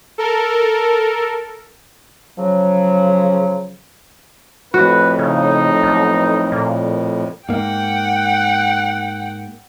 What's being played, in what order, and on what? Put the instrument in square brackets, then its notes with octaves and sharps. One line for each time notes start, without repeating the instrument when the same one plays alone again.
[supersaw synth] A4 A#4
[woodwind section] C#3 F3 F#3
[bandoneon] F2 A2 [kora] F#4 [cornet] B4
[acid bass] C#3 [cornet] D#4
[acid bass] B1
A#2
[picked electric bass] G#2 A#3 [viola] F#5 G5